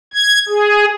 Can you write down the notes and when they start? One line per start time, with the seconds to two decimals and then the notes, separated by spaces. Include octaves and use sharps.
0.14 G#6
0.49 G#4